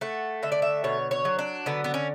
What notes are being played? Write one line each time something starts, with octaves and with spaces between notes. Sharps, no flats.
A3 F#5
D3 E5
D5
E5
B2 C#5
C#5
F#3
D4
D3 B3
B3
C#4